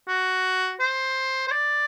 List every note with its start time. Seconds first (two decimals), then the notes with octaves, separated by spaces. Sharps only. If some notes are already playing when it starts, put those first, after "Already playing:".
0.08 F#4
0.80 C5
1.48 C5
1.51 D5